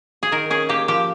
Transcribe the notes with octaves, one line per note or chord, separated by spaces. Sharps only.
G#4
D#3 A#4
C#4 G#4
A#3 G4
F3 G4